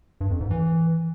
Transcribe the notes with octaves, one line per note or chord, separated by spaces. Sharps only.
G2
F2
G#2
E3